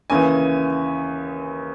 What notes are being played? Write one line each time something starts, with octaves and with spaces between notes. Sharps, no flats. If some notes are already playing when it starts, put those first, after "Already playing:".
D#2 C#3 E3 G#5